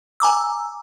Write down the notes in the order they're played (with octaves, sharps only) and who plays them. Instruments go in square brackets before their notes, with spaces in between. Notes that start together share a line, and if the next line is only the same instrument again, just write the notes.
[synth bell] G#5 A#5 D6 E6